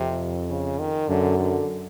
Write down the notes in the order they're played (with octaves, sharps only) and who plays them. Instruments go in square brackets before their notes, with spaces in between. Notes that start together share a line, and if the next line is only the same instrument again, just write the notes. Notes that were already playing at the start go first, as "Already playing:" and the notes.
Already playing: [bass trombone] F2 [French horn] C3
[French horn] C#3
D#3
[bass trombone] F#2 [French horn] D3
[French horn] D3